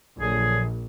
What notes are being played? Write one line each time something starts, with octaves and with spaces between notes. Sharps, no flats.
A#1 D3 F#3 G#4